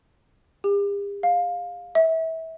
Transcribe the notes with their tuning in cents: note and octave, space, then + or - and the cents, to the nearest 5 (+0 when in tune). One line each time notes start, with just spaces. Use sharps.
G4 +45
F5 +20
E5 -30